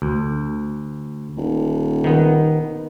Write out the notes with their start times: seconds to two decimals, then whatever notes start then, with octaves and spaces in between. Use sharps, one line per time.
0.02 D2
1.37 D#1
2.04 D#3 B3